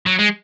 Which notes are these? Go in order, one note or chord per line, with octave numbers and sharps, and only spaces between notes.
F#3
G#3